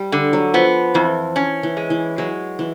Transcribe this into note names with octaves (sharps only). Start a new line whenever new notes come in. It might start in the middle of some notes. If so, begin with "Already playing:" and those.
Already playing: G3
D3
F#3
F3 B3
F2 E3
C#4
E3
G#3
E3
F#3 G#3
E3